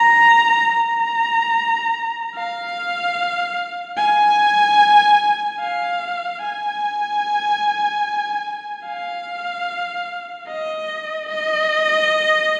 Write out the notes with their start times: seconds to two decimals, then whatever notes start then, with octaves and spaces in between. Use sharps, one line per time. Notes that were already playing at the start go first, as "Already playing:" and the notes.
Already playing: A#5
0.73 A#5
2.35 F5
3.97 G#5
5.60 F5
6.42 G#5
8.85 F5
10.48 D#5
11.29 D#5